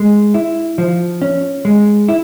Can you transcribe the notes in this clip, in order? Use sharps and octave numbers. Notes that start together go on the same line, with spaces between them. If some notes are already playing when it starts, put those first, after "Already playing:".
Already playing: G#3
E4
F3
C#4
G#3
E4